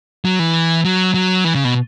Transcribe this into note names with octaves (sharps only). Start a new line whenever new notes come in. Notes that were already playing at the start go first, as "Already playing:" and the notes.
F#3
E3
F#3
F#3
E3
C#3
B2